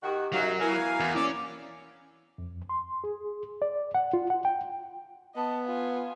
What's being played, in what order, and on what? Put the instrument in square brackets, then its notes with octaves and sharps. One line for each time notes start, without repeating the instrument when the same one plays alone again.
[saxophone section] D#3 F#4 [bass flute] G4
[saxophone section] F#2 [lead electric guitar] F#3 [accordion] D#4 F5
[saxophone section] B2 E3 A#4 [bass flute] E4 [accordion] F5 G#5
[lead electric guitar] E2
[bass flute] A#3 [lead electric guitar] C#4 [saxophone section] D5 [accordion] D6 E6
[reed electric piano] F2
C6
G#4
D5
F#5
F4
F#5
G5
[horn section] B3 [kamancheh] D#5 A5
[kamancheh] F4 G#5